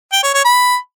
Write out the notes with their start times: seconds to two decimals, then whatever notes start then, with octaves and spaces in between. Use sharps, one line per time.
0.12 G5
0.23 C#5
0.34 C#5
0.45 B5